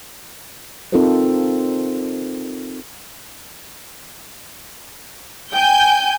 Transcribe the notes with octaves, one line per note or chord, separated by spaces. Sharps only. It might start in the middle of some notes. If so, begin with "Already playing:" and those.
C4 D#4 F4 A4 A#4 C5
G5 G#5 G6